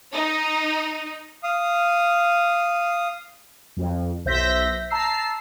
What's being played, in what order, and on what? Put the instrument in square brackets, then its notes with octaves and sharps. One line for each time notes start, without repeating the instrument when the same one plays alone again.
[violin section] D#4
[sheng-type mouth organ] F5 D#6
[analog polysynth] F2
B1 C5 E5 G6 A#6 B6
A5 A#5 E6 C7